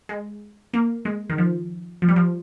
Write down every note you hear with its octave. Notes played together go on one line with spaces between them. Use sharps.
G#3
A#3
G#3
D#3
F3
F3
G3
F3